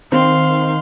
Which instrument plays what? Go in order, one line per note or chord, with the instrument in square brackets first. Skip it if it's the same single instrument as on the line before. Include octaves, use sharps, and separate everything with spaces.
[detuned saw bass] D#3 [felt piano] C4 [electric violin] F5 C6